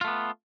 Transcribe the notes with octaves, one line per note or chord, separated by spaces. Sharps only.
A3 B3 F4